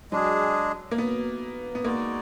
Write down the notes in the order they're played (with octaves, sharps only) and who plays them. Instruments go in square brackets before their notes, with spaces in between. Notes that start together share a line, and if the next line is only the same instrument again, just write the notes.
[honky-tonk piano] F#3 [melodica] G#3 D4 G#4
[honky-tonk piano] A#3
B3
B3
[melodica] G#3 D#4 F#4 D5 [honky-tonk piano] A#3